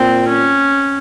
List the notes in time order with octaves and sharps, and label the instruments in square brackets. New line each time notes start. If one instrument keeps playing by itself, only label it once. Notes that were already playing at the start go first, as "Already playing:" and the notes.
Already playing: [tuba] A#2 [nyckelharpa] C4
[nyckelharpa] C#4